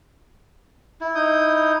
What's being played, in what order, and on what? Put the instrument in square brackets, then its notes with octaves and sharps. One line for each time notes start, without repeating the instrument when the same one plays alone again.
[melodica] E4
[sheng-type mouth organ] D#4 D#6 G6